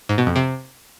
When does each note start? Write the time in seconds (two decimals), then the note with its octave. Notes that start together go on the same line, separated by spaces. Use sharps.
0.09 G#2
0.18 B2
0.27 F2
0.36 C3